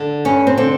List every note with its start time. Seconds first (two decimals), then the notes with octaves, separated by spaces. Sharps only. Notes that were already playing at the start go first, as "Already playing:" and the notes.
Already playing: D3
0.25 G2 C#4
0.47 C4
0.58 D3 C4